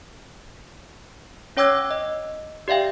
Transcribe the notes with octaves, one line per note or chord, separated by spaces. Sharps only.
C#4 C#5 G5 D6 E6 G#6
D#5
G4 D5 E5 F5 G5